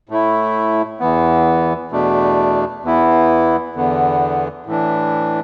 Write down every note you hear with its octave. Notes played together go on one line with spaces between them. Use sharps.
A2 A3 E4
E2 E3 B3
E2 B2 A3 D4
E2 E3 B3 E4
E2 D3 B3
A2 E3 D4